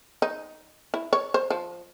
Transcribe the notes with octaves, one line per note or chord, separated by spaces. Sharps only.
D#4
E4
C#5
C5
F3